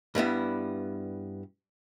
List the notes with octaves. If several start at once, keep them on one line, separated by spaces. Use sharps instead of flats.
G2 G3 B3 E4